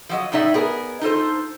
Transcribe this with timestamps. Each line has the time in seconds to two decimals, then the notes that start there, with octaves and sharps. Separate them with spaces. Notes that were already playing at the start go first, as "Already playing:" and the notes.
0.09 F3 F#3 D#5
0.32 A2 A3 D#4 D5 E5
0.54 B3 G#4 A#4
1.01 D#4 F4 A4 C5